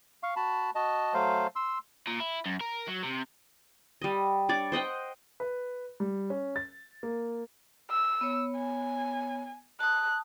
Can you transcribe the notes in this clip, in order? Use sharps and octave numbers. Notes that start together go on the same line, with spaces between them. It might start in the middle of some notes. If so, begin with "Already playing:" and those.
F5 C#6
F#4 A5 B5
F#4 D#5 A5
F#3 A3 C5 F5
C6 E6
A#2
E4
F#2
A#4
F#3
C3
G3 D#5
D4 C#5 D5 D6
C5 D#5 F#5 G5
B4
G3
C#4
A6
A#3
E6
B3 C#5
G#5
A5 D#6 F#6